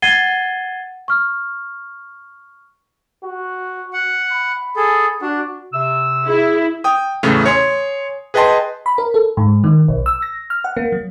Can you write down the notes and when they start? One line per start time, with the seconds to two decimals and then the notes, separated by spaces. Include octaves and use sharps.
0.02 F#5 G#6 A6 C7 D#7 G7
1.08 C#6 F6
3.23 F#4
3.93 F#5
4.31 B5
4.76 G#4 A4
5.22 D4 F#4
5.72 C3 E6
6.26 E4 G#4
6.84 G5 D#6
7.23 E2 A2 C#3 A3
7.46 C#5 G#5 C6
8.34 G#4 B4 D#5 G5 A5 C6
8.86 B5
8.98 A#4
9.14 A4
9.37 G#2
9.64 D#3
9.88 B1
10.06 E6
10.22 A#6
10.50 F6
10.64 F#5
10.77 A#3
10.92 F#3